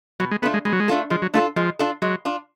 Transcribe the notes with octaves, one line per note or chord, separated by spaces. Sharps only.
B2 F#3
G#3
A3 B3 D4 F4 A4
G#3
B2 G#3
F#3
G#3
A3 D4 F4 A4
F3 G#3
F#3
A3 D4 F4 A4
F3 G#3
D4 F4 A4
F#3 G#3
D4 F4